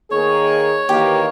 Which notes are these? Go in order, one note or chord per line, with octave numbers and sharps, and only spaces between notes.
D#3 A#3 G#4 C#5
D#3 E3 A#3 G4